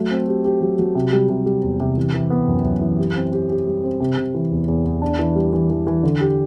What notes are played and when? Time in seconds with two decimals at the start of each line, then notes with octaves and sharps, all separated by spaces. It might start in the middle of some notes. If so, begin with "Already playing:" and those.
Already playing: F#3 A3
0.11 C4
0.28 G4
0.45 G4
0.61 F#3
0.79 F#3
0.95 C3
1.13 G3
1.29 C3
1.46 G3
1.63 E2
1.80 C3
1.97 E3
2.14 E3
2.30 B3
2.48 F#2
2.65 F#2
2.81 E3
2.99 G4
3.15 C4
3.32 G4
3.50 G4
3.67 G3
3.83 C4
4.00 C3
4.17 C3
4.34 E3
4.51 E2
4.68 E2
4.85 E2
5.02 D4
5.19 E3
5.36 G3
5.53 E3
5.70 E3
5.87 E3
6.03 D3
6.21 G4